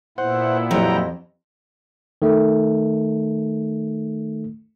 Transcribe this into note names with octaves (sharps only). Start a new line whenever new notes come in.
A#2 B3 E4 C5 F#5
F2 E3 F#3 G4 G5 A#5
D#3 A3